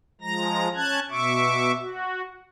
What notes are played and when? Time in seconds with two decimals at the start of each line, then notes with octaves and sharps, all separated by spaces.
0.21 F3 G#3 A#5 A#6
0.75 C#4 A5 F#6 G#6
1.09 B2 E5 C#6 D6
1.79 F#4